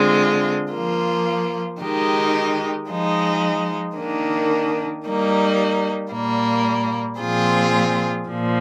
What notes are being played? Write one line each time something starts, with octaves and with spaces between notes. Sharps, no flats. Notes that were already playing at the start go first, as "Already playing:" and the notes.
Already playing: D3 G#3 C4 F4
F3 A#3 F4
D#3 G#3 D#4 G4
F3 G#3 D#4
D#3 A#3 D4
G3 A#3 D#4
A#2 G3 A#3
A#2 F3 C4 F4 G#4
A#2 F3